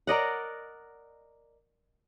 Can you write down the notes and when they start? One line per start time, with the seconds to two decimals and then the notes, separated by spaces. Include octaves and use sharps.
0.07 A#4 D5 D#5 F#5